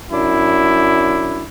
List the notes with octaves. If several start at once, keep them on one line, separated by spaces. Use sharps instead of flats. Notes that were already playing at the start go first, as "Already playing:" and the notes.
F#2 D4 E4